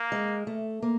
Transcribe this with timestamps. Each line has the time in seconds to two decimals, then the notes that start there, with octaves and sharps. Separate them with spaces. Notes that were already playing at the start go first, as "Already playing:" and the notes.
Already playing: A#3
0.12 G#3
0.47 A3
0.82 A#3